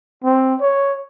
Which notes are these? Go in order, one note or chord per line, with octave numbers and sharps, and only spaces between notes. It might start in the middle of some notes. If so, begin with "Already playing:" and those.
C4
C#5